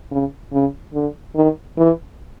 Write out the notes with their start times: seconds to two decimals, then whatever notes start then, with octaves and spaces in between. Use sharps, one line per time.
0.12 C#3
0.53 C#3
0.94 D3
1.35 D#3
1.78 E3